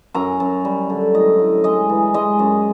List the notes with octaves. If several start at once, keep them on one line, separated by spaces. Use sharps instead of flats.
F#2 A#5
F#2
G3
D3
A2 D#5
A2
G#3 D#5
E3
G#3 D#5
F#2